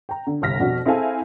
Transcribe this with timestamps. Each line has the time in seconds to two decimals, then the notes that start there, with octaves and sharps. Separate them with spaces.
0.09 G5 A#5
0.27 D3
0.42 G1 C2 F6 A#6 B6
0.60 F2 B2 D4 F#4
0.86 C4 E4 G#4 A4 F5 G#5